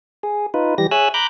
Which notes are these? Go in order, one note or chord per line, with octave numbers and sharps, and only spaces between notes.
G#4
D#4 F4 B4
E3 G3 G4 A#6
G#4 C#5 E5 G#5 E6 F#6
A#5 B5 D6 F#6 G6